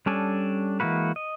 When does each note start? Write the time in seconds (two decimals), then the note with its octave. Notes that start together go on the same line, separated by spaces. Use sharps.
0.06 G3 C#4 D4 A4 G#5
0.80 E3 G#3 A#3 F#4 B4
1.16 D#5